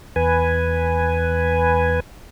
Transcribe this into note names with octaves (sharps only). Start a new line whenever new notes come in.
E2 B4 G#5